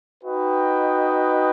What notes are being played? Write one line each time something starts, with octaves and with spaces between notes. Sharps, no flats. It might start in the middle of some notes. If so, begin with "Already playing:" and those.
D#4 F#4 B4 D#5 G5